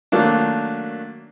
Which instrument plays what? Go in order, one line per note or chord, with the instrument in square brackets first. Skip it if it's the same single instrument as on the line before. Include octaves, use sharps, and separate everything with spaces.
[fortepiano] D#3 F#3 A3 A#3 D4